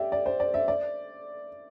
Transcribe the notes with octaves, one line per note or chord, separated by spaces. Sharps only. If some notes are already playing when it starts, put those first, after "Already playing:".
Already playing: G4 D5 E5
D5
C5
D5
E5
D5